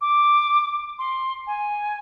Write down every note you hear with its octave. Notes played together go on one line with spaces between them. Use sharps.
D6
C6
G#5